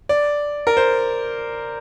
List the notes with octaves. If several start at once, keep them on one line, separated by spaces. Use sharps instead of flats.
D5
A#4
C5